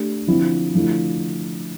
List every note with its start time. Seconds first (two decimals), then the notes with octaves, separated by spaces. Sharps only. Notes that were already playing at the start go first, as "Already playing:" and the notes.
Already playing: A3 D4 G4
0.27 D3 F3 C4 E4
0.75 D3 F3 A3 E4